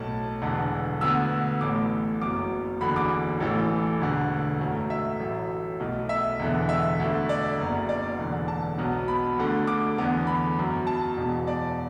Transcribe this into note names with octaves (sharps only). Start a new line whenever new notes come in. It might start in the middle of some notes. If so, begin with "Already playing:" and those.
Already playing: B1 A2 A3 A5
E1 E2 D3
D2 D3 B3 E6
A1 A2 A3 D6
F#1 F#2 F#3 B3 D6
F#1 E2 D3 F#3 B5
D6
A1 A2 E3 A3
E1 D2 D3
F#2 F#3 A3
E5
A1 A2 F#3 A3
B1 B2 A3
E5
E1 E2 D3
E5
D2 D3 A3
D5
F#1 F#2 F#3 B3
D5
E1 E2 D3
A5
B1 B2 F#3 B3
B5
D2 D3 A3
D6
E2 D3 B3
B5
F#2 F#3 B3
A5
E1 E2 B2
D5